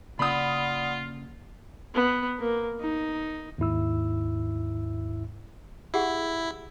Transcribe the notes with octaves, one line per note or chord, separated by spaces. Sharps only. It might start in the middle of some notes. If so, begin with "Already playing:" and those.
C#3 A#3 C#4 F4 D5 F#5 B5 D#6
B3
A#3
D#4
D#2 G#2 E4 E6
E4 G4 G#4 F#5